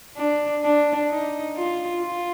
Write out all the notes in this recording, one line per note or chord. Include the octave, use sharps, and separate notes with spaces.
D4
D4
D#4
F4
F4